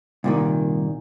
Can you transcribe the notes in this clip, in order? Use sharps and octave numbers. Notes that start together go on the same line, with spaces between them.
C2 A#2 D#3